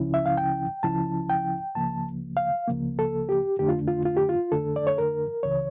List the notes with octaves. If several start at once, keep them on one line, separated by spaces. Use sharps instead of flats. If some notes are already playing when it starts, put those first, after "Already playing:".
Already playing: C#2 C#3 F3 C#4 E4
E5
F5
G5
C#2 C#3 F3 C#4 E4 A5
G5
C#2 C#3 F3 A#3 A5
F5
C#2 C#3 F3 A#3
A4
G4
F2 D3 A3 D4 G4
F4
F4
F4
G4
F4
F2 D3 A3 D4 A4
D5
C#5
A#4
C#2 C#3 E3 C#5